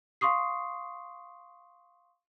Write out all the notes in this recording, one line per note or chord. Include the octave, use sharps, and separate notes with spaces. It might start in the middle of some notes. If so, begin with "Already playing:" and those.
F5 C6 C#6 D#6 C7